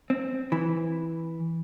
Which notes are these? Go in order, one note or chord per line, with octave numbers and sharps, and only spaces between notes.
C4
E3